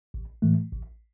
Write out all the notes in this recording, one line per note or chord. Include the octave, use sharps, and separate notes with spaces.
A1
A2 E3 A3
A1